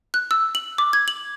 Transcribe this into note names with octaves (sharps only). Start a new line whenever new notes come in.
F#6
E6
F#7
D6
G#6
F#7